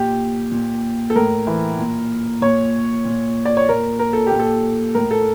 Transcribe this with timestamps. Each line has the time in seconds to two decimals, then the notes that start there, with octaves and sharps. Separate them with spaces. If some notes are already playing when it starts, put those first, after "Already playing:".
Already playing: A#2 G4
0.52 A#2
1.10 A4
1.16 A2 A#4
1.47 E3
1.78 A#2
2.41 A#2 C#5
3.05 A#2
3.45 D5
3.57 C#5
3.69 A#2 A#4
3.99 A#4
4.13 A4
4.27 A#2 G4
4.39 A4
4.95 A2 A#4
5.11 A4